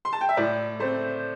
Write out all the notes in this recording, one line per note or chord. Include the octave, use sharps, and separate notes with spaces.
C6
A5
G5
E5
A2 D5
A3 C4 C5